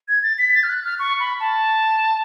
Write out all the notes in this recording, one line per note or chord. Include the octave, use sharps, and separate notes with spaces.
G#6
A6
B6
A6
F6
F#6
F6
C#6
B5
A5